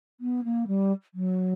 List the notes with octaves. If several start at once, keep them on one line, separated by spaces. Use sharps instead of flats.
B3
A#3
G3
F#3